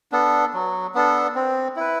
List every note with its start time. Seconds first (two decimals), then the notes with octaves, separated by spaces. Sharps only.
0.12 B3 D4 A4
0.54 F#3
0.95 B3 D4 A4
1.35 C4
1.76 E4 B4